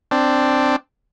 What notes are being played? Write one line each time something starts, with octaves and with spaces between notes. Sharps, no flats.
C4 D4